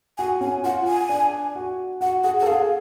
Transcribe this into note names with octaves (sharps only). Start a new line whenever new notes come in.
F#4 G#5
C#4 G#5
F4 F#5
G#5
D4
F#4
F#4 F#5
G#4 F#5
F#5
A4
G#4 F5